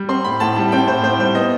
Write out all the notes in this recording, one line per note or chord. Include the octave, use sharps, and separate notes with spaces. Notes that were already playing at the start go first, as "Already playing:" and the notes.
Already playing: G3
C4 C6
A2 B5
A2 A5
G3 A5
C4 G5
A2 C5
A2 C5
G3 C5
B3 D#5